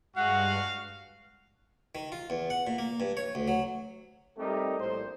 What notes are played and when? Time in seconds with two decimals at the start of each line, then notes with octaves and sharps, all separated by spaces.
0.16 G2 G#3 F#4 F5 F#5
1.95 D#3
2.12 F4
2.30 E2
2.50 F#5
2.67 A#2
2.79 A#3
3.00 G2
3.17 C#5
3.35 D2
3.48 F#3
4.38 G3 A3 C4 D#4 G4 A#4
4.79 A#1 A2 G3 C5